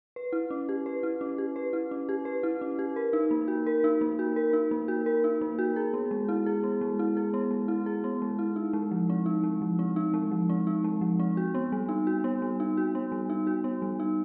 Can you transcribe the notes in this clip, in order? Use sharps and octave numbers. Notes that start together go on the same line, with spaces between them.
B4
E4
C#4
G4
B4
E4
C#4
G4
B4
E4
C#4
G4
B4
E4
C#4
G4
A#4
D#4
A#3
F#4
A#4
D#4
A#3
F#4
A#4
D#4
A#3
F#4
A#4
D#4
A#3
F#4
G#4
B3
G#3
E4
G#4
B3
G#3
E4
G#4
B3
G#3
E4
G#4
B3
G#3
E4
D#4
G#3
F3
C4
D#4
G#3
F3
C4
D#4
G#3
F3
C4
D#4
G#3
F3
C4
F#4
B3
G3
D#4
F#4
B3
G3
D#4
F#4
B3
G3
D#4
F#4
B3
G3
D#4